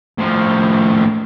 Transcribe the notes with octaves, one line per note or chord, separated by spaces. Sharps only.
A2 F3